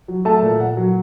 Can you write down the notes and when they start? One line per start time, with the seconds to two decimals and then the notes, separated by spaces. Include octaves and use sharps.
0.08 F#3
0.25 A3 A5
0.43 A#2
0.60 A#2 F#5
0.77 F#3